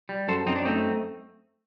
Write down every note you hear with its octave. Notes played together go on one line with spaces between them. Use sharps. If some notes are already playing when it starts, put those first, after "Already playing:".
G3
F#2 A4 C5
F#2 C4 D#4
D4
A3 C4 D#4